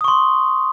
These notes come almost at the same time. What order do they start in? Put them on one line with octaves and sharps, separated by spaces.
D#6 C#6 C6